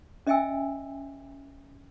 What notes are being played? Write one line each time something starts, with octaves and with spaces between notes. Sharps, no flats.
C#4 D#5 E5 G5 G#5 E6